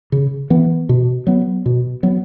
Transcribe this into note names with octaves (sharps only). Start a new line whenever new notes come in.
C#3
E3 B3
B2
F#3 B3
B2
F#3 B3